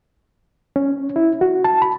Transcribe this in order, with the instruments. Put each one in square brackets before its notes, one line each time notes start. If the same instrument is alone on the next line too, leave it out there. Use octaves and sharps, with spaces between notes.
[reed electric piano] C#4
E4
F#4
A5
B5